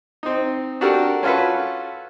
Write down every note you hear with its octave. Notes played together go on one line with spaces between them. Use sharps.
C4 D#4
D4 F#4 G4 A4 A#4
C#4 F4 F#4 A4 B4